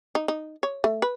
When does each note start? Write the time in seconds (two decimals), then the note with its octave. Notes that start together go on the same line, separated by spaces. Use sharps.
0.15 D#4
0.28 D#4
0.63 C#5
0.84 A3
1.02 B4